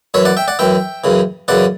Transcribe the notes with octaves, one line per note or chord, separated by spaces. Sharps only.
F#2 E3 C#5 E5
D5 F#5
E5 G5
D5 F#5
F#2 E3 E5 G5
F#2 C#3 E3
F#2 C#3 E3 D5 F#5